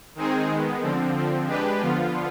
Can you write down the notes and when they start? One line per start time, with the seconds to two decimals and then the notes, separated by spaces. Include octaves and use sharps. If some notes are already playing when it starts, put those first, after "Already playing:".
0.15 D#3 G#3 C4 D#4 G#4
0.48 D#3 G#3 B3
0.81 D3 F3 C4
1.15 D3 F3 C4
1.47 G#3 D4 G4 B4
1.81 D3 F3 B3 F4